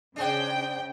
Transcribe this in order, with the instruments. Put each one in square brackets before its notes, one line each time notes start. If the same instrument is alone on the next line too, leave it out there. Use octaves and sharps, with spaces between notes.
[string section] C#3 G5 [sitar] D4 G#4 C5